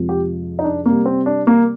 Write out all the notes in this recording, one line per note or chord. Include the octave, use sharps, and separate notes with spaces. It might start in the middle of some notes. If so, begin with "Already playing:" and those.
Already playing: F2 C3 F3 G#3
G4
D#4
D4
C3 G3 A#3
C4
D4
A#3